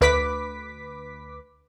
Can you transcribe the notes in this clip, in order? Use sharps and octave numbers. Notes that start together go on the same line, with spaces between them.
D2 B4 D6 B6